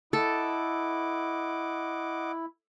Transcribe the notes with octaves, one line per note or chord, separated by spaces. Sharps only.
E4 A4 D#5 F#5 D6